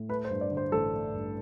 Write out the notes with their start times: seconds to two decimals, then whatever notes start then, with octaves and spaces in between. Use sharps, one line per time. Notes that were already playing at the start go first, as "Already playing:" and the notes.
Already playing: A2
0.09 A3 B4
0.25 C5
0.31 G2
0.41 D5
0.51 D3
0.57 C5
0.72 A1 A4
0.94 A3
1.14 G2